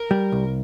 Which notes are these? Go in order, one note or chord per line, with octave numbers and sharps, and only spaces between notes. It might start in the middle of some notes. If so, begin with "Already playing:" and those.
Already playing: A#4
G3
C2